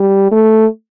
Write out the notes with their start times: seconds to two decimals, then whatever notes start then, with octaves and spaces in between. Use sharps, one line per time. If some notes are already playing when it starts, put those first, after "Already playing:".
Already playing: G3
0.32 A3